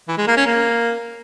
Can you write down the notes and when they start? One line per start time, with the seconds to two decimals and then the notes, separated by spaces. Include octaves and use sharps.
0.08 E3
0.18 G#3
0.27 A#3
0.37 C#4
0.46 A#3